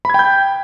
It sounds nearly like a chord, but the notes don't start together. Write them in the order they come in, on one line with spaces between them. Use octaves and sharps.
B5 G#6 G5 G6